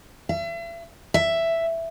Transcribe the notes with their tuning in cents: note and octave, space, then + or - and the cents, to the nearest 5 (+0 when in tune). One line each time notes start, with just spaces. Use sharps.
E5 +40
E5 +5